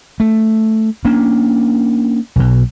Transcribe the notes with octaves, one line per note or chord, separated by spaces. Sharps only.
A3
A#3 C#4 D4
B1 B2